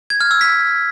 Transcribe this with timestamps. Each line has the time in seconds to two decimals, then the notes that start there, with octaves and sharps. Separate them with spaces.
0.10 G#6
0.21 F6
0.31 E6
0.41 B6